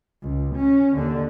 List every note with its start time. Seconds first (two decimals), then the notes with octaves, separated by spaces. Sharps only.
0.23 C#2
0.56 C#4
0.96 D#2 D3